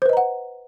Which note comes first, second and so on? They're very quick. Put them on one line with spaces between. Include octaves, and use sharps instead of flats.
C5 B4 D#5 A#5 F#5